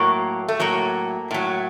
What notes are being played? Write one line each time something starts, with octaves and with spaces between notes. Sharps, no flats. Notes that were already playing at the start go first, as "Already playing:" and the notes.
Already playing: A2 F#3 A#3
A3
A2 F#3 A#3
A2 F#3